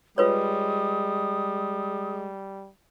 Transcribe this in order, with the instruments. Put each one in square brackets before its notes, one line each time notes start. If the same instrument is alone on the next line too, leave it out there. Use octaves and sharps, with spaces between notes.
[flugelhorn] G3 [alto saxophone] G#3 [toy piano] F4 B4 C#5 [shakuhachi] D#6